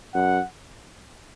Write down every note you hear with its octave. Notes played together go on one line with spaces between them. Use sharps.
F#2 F#5